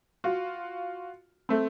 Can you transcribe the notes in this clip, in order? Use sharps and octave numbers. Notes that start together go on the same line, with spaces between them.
F4 F#4
A3 C4